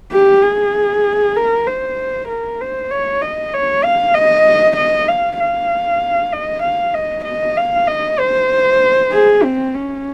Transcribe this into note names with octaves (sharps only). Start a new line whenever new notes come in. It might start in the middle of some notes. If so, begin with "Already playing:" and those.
G4
G#4
A#4
C5
A#4
C5
C#5
D#5
C#5
F5
D#5
D#5
F5
F5
D#5
F5
D#5
D#5
F5
D#5
C5
G#4
C4
C#4